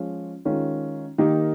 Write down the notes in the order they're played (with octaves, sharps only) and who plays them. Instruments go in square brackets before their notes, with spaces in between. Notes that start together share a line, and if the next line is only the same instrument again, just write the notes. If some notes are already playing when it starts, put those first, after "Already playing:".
Already playing: [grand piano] F3 G#3 C#4 F4
D#3 G#3 C#4 F4
D#3 A#3 D#4 G4